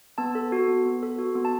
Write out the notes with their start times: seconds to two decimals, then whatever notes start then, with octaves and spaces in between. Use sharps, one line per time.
0.18 B3 A5
0.35 A4
0.52 F#4
0.68 B3
0.85 B3
1.03 A4
1.19 F#4
1.35 B3
1.45 A5